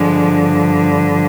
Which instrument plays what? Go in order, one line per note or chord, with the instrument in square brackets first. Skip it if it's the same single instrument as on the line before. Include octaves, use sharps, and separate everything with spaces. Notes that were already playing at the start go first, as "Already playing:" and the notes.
Already playing: [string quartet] G2 D3 F3 G#3